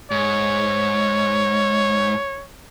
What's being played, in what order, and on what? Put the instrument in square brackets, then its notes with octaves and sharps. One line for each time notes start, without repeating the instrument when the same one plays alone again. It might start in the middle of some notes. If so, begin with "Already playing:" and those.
[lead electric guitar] G#2 [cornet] C#5